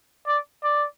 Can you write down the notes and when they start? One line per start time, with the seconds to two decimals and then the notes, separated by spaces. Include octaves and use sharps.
0.27 D5
0.63 D5